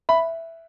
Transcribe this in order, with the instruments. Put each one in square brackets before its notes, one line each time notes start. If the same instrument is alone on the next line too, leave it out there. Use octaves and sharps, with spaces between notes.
[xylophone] E5 [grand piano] B5